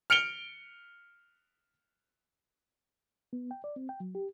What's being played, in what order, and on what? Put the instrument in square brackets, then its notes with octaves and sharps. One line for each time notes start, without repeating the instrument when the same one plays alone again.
[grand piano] F6 C#7 D7 F7 G7
[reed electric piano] B3
G5
D5
C4
G5
F#3
G4